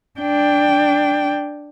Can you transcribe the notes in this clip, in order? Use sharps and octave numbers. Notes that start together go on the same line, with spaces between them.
D4 G5